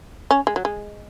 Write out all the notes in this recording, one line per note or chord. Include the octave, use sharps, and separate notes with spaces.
C#4
G#3
F#3
G#3